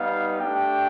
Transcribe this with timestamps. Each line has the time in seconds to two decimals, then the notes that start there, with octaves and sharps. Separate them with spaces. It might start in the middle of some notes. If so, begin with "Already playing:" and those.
Already playing: G3 B3 D#4 F5
0.40 A3 D4 G4 G5